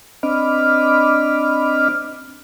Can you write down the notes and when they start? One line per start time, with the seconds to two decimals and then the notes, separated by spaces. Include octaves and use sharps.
0.23 C4 D4 D#5 B5 D6 F6